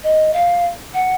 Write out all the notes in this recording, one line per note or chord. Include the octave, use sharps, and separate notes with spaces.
D#5
F5
F#5